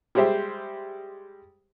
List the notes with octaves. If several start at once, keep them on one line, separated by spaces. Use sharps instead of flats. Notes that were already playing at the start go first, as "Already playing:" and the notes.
G3 G#3 G4 C5 E5